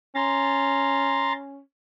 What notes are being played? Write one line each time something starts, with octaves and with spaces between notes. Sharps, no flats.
C#4 A#5 C6 A6